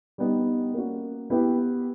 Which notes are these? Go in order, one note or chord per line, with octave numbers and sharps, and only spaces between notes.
G3 B3 D#4
A#3 C#4 F#4
B3 E4 G4 B4